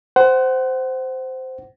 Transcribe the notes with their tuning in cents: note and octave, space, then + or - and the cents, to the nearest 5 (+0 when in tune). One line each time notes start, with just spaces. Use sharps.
C5 -10 F#5 +25